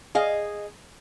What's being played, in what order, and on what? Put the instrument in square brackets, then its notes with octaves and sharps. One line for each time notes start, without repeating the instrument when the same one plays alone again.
[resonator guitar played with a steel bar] G#4 D#5 F5